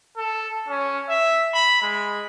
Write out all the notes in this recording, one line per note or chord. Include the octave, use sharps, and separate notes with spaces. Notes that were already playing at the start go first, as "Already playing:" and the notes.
A4
C#4
E5
B5
G#3